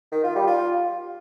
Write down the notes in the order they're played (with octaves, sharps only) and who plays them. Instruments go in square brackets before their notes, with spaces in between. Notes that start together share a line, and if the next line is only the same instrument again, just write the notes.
[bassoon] D#3
F4
G3
F4